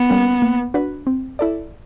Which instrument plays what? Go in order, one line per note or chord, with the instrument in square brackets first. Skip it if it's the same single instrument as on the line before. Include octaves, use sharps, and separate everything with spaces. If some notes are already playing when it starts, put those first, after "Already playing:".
Already playing: [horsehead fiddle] B3
[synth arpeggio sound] G3 A#3 C#4
A#3
D4 F#4 B4
C4
E4 A4 D5